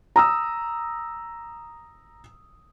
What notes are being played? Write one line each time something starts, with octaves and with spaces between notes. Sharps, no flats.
A#5 D#6 E6